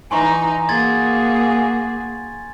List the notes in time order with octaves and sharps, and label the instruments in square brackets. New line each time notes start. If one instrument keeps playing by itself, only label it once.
[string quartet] E3 D#4 A#5 [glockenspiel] G#5 C6 C#6
[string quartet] A#3 F#4 G#4 [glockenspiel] C6 G#6 A6